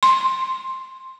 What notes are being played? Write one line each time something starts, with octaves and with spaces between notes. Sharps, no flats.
C6